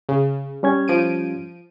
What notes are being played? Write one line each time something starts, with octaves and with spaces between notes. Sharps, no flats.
C#3
G3 C#4 G#6
F3 D7 D#7